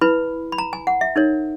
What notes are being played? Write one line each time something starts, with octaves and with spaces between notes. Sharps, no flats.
E4 B4 B5
B5
A#5
G#5
F#5
E5
D#4 A#4 C#5